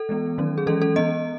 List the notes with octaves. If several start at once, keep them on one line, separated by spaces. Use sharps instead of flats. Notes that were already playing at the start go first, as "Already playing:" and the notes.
Already playing: A4
E3 G#3 B3
D#3 F#3 C#4
G#4
E3 G#3 C#4 A4
A4
E3 B3 D#5